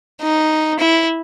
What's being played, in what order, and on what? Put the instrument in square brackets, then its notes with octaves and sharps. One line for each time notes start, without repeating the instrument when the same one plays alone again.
[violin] D#4
E4